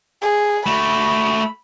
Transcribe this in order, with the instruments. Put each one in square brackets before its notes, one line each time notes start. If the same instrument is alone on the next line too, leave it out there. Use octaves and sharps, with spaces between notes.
[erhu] G#4
[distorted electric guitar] A3 F#4 [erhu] B5